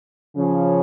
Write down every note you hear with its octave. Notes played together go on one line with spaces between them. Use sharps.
C#3 F3 C#4